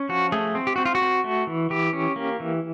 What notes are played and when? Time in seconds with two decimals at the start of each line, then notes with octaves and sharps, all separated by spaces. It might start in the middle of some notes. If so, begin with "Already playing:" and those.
Already playing: C#4
0.09 F3 F#4
0.32 A3 G#4
0.55 C4
0.67 G4
0.76 C4 F#4
0.85 F4
0.95 F#4
1.02 C4
1.24 A3
1.47 E3
1.70 E3 G4
1.93 C#4
2.16 A#3
2.40 E3